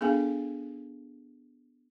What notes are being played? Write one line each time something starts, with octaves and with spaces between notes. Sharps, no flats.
B3 D4 G#4 A4 F5 G#5